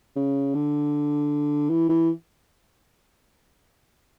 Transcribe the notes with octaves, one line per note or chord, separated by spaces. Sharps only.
C#3
D3
E3
E3